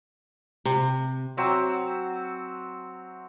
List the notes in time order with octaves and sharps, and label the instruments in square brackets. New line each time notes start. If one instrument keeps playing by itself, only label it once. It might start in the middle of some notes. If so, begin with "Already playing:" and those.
[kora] C3
[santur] F#3 C4 E5